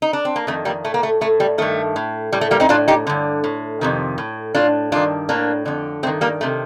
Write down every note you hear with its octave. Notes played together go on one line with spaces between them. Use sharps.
D#4
D4
C4
A#3
F2 D#3 A3
G3 A#3
A2 A3
A#3
A3
A2 A3
G3
G2 D#3 A3
A2
A2 G3
A3
G3 A#3
C4 D#4
A2 D4 F4
D#4 G4
G2 D3
A2
F2 C3 D#3
A2
A2 D4 F4
G2 D#3 D4 F4
A2 A#3 D4
F2 D3
G2 D#3 A3 C4
G3 A#3
C3 D#3 A3